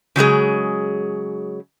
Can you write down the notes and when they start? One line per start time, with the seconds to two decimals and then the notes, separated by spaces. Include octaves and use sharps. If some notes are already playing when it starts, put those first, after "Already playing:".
0.16 C#3 F#3 G#3 G#4